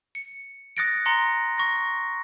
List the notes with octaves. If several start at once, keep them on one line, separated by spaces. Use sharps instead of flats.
C#7
D#6 F#6 A6 A#6 C#7 D7
A#5 C6 A#6 C#7 G7
C#6 A#6